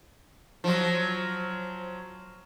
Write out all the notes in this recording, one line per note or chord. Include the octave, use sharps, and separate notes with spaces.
F3 F#3